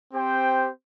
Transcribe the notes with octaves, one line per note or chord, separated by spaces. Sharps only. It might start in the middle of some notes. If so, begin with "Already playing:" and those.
C4 G4 C5 G5